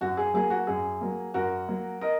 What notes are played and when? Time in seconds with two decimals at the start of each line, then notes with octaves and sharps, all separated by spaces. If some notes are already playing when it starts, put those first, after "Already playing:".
0.01 F#2 F#4
0.17 G#4
0.34 F#3 A#3 G#4
0.50 F#4
0.67 F#2 G#4
1.01 F#3 A#3
1.34 F#2 F#4 A#4
1.68 F#3 A#3
2.01 A#4 D#5